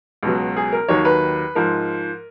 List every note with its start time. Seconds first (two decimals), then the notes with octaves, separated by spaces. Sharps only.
0.23 C#2 B2 F#3
0.56 G#4
0.72 A#4
0.89 D#2 D#3 F#3 C#5
1.05 B4
1.55 G#2 F3 A#4